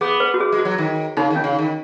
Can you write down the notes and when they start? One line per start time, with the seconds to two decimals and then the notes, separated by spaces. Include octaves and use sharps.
0.01 B3 G#4
0.20 B4
0.34 F#4
0.40 G#4
0.52 G#3
0.58 F#4
0.65 F#3
0.78 D#3
1.17 C#3 D#4
1.30 D#3
1.36 C#4
1.44 C#3
1.59 D#3